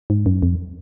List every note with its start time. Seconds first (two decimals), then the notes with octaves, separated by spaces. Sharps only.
0.10 G#2
0.26 F#2
0.42 F2